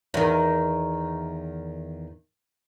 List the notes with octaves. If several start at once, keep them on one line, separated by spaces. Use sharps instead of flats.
E2 D#3